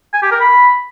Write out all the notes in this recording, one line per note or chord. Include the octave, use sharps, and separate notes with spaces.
G#5
G4
A#4
B5